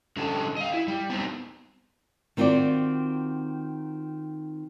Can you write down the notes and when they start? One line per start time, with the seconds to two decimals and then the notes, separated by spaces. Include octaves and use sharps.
0.17 D3 G3 C#4 A4
0.57 D#5 F5
0.74 E4
0.88 G3
1.10 B3 C4 D#4
2.37 D#3 C4 F4 F#4 D5